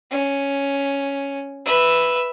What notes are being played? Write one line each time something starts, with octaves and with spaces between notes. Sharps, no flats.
C#4
B4 E5